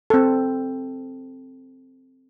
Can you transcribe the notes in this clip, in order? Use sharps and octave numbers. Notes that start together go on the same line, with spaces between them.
C4 A4